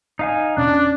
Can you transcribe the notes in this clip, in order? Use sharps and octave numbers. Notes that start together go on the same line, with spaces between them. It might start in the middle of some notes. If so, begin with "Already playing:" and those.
D#4 F5 G#5
E2 B2 C#4 D4 F#6